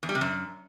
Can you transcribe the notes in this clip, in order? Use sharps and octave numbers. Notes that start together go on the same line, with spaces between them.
E2
G3
C3
F#2